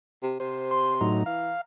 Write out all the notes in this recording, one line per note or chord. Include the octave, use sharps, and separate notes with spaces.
C3
C3 C5
C6
A2 F#3 D#4 A#5
E3 F5